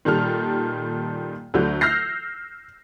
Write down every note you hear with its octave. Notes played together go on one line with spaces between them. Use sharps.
A#2 D#3 G3 A4 F6
D2 D3 F#3 G6
E6 F6 G6 A#6 C7